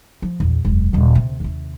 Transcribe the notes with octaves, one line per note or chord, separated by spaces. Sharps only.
F3
A#1 E2
E1 F#2
D#1 C#3
D2 C3
D#2 C3